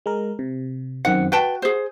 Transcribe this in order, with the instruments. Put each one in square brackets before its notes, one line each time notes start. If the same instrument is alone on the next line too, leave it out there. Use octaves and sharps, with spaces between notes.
[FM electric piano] G#3 A#4
C3
[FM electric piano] F#2 D#3 C4 [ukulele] F#5
[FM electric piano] F#4 [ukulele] B4 G5 A5
[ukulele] G#4 C5